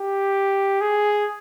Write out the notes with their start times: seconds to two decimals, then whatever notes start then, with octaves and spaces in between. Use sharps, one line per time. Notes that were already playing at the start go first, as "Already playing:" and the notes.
Already playing: G4
0.81 G#4